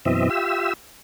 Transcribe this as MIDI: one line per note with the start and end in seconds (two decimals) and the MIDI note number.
0.05 0.29 42
0.05 0.29 47
0.05 0.29 52
0.05 0.29 60
0.05 0.29 75
0.05 0.29 76
0.30 0.73 65
0.30 0.73 67
0.30 0.73 76
0.30 0.73 88